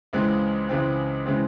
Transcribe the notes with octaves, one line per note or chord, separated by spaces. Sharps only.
C#2 C#3 E3 G#3 C4
C#2 C#3 E3 G#3 C4
C#3 E3 G#3 C4